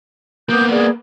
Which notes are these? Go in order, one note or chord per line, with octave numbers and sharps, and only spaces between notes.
A#3 B3 D6 D#6 G6
G#4 D5